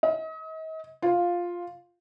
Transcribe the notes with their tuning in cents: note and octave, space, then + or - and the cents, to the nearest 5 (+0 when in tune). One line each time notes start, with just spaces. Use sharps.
D#5 +40
F4 +5